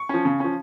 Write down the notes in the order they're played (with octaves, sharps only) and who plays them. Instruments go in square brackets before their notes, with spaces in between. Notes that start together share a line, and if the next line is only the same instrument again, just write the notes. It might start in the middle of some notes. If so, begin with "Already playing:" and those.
Already playing: [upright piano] C#6
F3 C#4
C#3
F3 C#4